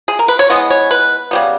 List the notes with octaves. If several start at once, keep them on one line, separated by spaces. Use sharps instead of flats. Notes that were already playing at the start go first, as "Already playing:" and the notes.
G#4
A#4
B4
C#5
E3 G#3 B3 D#5
C#5
B4
C#3 G3 B3